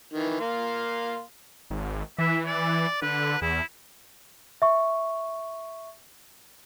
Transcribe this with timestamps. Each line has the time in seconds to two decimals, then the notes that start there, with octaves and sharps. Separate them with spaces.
0.13 D#3 E3
0.40 A#3 F5 C6
1.70 G#1
2.18 E3 E5
2.46 D5
3.02 D3 B4
3.42 E2 E4
4.62 E5 C#6